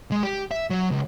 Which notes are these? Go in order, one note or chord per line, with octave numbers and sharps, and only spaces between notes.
G#3
G4
E5
F#3
C#2